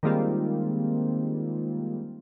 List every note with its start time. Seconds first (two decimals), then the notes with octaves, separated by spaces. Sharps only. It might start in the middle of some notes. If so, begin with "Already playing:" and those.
0.03 D#3 G3 G#3 A#3 C4 F4